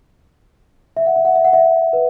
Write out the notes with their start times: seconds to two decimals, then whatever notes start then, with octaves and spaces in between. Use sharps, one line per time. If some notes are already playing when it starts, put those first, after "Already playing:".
0.97 E5
1.06 F#5
1.16 E5
1.25 F#5
1.35 E5
1.44 F#5
1.53 E5
1.93 B4